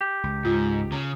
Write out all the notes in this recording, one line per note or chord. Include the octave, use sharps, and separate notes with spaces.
G4
C#2
G#2 F4
C#3 A#5